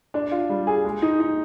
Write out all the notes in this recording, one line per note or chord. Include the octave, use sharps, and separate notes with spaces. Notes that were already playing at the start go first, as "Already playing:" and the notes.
D4
F4
G3
G#4
G#3
D#4
D#4